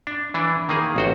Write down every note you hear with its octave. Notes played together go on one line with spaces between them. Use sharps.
D4
E3 D4
D#3 A#3 G#4
A1 F#4 C5